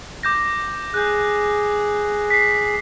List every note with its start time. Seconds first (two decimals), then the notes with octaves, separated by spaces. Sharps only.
0.23 D6 G6 A#6
0.94 G#4 F#6 G6
2.30 B6 C7